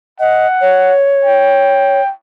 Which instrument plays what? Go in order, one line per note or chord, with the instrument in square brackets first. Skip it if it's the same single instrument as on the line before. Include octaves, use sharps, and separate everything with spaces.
[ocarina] D#5 [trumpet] F#5
[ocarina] C#5
[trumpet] G5